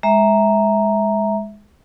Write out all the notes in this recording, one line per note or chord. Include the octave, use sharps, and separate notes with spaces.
G#3 E5 A#5